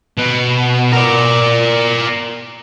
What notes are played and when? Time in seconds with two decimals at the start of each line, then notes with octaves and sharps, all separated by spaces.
0.18 B2
0.92 A#4 D5